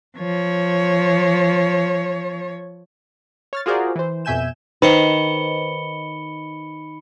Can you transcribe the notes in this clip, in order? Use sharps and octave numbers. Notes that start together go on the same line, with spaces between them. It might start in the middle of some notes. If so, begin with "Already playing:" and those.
F3 C#5
C#5 F6 A6
F4 F#4 G#4 A#4 C5 D5
E3 C5
F2 B2 E5 G#5 G6 E7
D#3 B4 C5 D#5 B5 C#7 G7